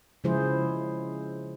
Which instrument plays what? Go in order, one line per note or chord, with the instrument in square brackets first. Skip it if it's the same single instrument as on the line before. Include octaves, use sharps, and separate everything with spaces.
[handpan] C#3 F3 G#3 E4 G#4 C5